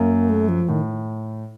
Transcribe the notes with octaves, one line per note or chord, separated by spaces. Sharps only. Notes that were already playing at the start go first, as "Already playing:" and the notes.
Already playing: F#2 A#3
A3
F3
A2 D#3